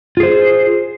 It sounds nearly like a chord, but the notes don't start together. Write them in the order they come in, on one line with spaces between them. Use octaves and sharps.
F4 G#4 C5